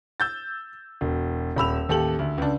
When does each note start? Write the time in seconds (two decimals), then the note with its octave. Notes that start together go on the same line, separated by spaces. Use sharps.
0.20 E6 G6 A6
1.01 E1
1.56 D#1 B5 E6 F7
1.89 A1 D#2 G4 A4 F#7
2.19 D2
2.38 C#2 D4